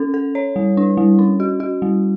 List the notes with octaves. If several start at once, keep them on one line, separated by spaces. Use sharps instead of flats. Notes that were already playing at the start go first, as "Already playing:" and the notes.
Already playing: C#4 A4
A4
C#5
G3
D4
G3
C#4
F#4
F#4
G3